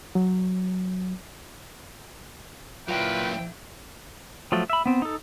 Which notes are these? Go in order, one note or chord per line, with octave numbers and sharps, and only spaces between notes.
F#3
A#2 F#3 A#3 E4 B4 G5
F3 F#3 A3
E5 B5
B3 C4
D#4 A4